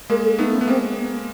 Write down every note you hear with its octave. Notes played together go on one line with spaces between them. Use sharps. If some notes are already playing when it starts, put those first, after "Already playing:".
G#3 A#3 A#4
A4
A3 B3 D#4
C#4
B3
G#3 A#3 C4
B3